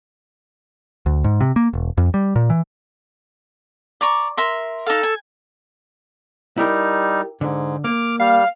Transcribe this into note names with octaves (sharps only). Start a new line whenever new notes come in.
D2
G#2
C3
A#3
E1
F2
G3
A#2
E3
D5 A#5 C#6
A#4 E5 C6
D#4 A4 F5
G#5
G3 D#4 E4 G4 A#4
G#2 D3
A#3 D6 F6
G3 F5